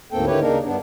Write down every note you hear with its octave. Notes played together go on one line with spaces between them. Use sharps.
D2 G#2 A#3 C4 A4 G5
D3 D#3 E4 G4 B4 C#5
C#3 A#3 D4 D#4 A#4
G2 B3 D4